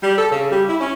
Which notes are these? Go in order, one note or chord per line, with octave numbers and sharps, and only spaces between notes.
G3
A4
C#3
G3
E4
C#4